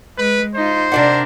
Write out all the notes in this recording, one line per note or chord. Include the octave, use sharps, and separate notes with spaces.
G#3 B4
D#4 F4 C5
C3 D4 A#4 D5 F#5